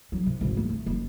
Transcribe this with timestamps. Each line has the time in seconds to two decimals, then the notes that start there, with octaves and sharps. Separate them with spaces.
0.12 F#3
0.26 C3
0.41 G#1 C#2
0.57 A3
0.69 A3
0.86 F#1